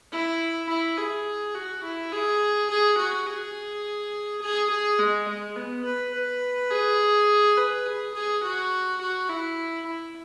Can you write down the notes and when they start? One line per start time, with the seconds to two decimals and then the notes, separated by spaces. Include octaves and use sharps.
0.12 E4
0.69 E4
0.98 G#4
1.55 F#4
1.83 E4
2.12 G#4
2.70 G#4
2.98 F#4
3.27 G#4
4.42 G#4
4.70 G#4
4.99 G#3
5.28 G#3
5.56 B3
5.85 B4
6.14 B4
6.71 G#4
7.57 B4
7.86 G#4
8.15 G#4
8.43 F#4
9.01 F#4
9.29 E4
9.86 E4